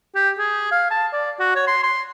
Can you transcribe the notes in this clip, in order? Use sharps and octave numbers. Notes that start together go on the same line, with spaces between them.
G4
G#4
F5
A5
D5
F#4
C#5
C6
C6